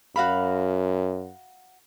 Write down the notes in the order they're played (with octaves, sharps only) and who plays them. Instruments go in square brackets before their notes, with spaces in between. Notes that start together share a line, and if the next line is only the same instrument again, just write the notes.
[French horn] F#2 [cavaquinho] F#4 F5 B5